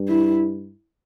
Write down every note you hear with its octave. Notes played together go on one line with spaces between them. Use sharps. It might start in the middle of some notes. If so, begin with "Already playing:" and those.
Already playing: G2
E4